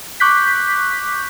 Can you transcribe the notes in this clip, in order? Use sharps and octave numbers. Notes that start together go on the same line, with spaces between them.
C#6 D6 F#6 G6 B6